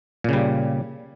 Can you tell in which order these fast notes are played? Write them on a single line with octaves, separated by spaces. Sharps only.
A#2 C#3 G3